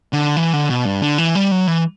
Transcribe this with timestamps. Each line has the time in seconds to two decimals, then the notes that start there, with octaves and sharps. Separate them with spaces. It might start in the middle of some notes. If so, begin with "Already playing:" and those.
0.13 D3
0.37 E3
0.53 D3
0.70 B2
0.85 G2
1.02 D3
1.18 E3
1.35 G3
1.51 F#3
1.67 E3